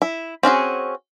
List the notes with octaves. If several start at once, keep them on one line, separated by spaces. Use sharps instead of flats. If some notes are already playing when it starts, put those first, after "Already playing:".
E4
C4 C#4 F#4 G#4